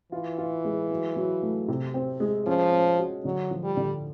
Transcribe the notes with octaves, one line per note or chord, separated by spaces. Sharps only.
E3 F4
F4
G#3
F#3
F#3
A3
C3
C4
G#3
F3 C#4
C#4
F#4
D3 F#3
F3
G3
D3